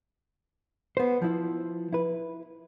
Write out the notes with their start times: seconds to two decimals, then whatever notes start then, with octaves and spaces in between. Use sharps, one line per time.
0.97 B3 C5
1.22 F3 E4
1.93 E4 B4